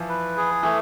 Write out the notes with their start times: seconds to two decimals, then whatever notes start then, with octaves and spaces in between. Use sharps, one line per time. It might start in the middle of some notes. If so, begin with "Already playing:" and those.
Already playing: E3 F3
0.09 B4
0.37 G#4
0.63 E3 A3